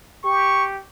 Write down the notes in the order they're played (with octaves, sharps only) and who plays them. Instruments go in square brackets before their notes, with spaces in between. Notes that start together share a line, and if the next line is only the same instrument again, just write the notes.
[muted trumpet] G4 [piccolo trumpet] C#6